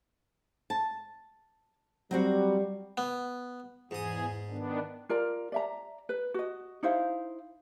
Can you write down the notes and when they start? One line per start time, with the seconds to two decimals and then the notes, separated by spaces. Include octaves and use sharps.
0.70 A5
2.11 F#3 G3 C4 F#4
2.97 B3
3.91 E2 G#2 G#4 D#6
4.49 D#3 B3 D4
5.09 F4 A#4 D5 A#5
5.52 D5 E5 A#5
6.09 B4
6.34 F#4 D#5
6.83 D#4 E4 C5 F5